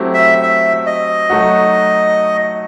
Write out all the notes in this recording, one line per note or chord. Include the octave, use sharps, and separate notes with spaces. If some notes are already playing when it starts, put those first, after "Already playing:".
Already playing: F#3 A3 C4 E4 G4
E5
E5
D#5
F#3 A3 D#4 F#4